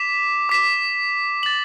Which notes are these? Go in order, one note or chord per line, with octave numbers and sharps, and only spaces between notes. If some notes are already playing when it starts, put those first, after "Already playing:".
Already playing: D6 B6 E7
D6 B6 E7
A6 F#7